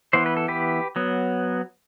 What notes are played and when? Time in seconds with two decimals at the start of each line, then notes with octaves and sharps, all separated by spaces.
0.13 E3 B3 C5
0.26 B4
0.37 A4
0.48 G4 B4
0.96 F#3 B3